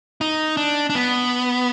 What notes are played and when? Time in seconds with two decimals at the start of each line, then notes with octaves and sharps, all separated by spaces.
0.21 D#4
0.57 D4
0.90 D4
0.95 B3